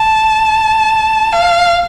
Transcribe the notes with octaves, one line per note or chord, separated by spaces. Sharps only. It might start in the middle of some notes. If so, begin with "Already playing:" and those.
Already playing: A5
F5